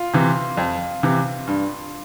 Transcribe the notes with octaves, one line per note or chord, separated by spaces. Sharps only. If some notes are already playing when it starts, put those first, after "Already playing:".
Already playing: F4
C3 E3
F2
C3 E3
G2